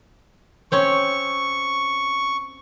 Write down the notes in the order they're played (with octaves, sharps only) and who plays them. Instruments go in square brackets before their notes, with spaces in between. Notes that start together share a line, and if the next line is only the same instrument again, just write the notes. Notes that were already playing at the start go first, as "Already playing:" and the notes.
[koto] C4 C#4 C#5 [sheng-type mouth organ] C#6